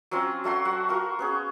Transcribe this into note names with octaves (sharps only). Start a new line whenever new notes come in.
F#3 C4 C#4 F4
F#3 A3 F#4 C6
F#3 F#4 F#5
F4 F#4 A#4
B3 C#4 G#4